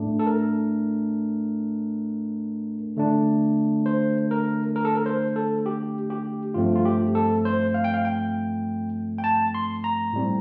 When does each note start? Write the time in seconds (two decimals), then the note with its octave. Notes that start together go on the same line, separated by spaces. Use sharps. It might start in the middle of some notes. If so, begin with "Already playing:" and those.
Already playing: A2 A3 D4
0.19 A4
0.27 A#4
2.97 D3 A3 D4
3.86 C5
4.31 A#4
4.76 A#4
4.85 A4
4.95 A#4
5.06 C5
5.36 A4
5.66 G4
6.10 G4
6.54 G2 F3 A3 C4 F4
6.75 F4
6.85 G4
7.15 A4
7.45 C5
7.74 F5
7.84 G5
7.94 F5
8.05 G5
9.18 G5
9.24 A5
9.54 C6
9.84 A#5
10.13 A2 G3 C4